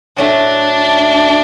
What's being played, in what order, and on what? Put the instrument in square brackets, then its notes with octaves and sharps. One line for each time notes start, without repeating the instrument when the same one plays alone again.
[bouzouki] A2 F#3 A3 [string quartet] D4